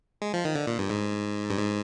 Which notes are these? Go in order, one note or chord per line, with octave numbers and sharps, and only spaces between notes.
G#3
F3
D#3
D3
A#2
G2
G#2
G2
G#2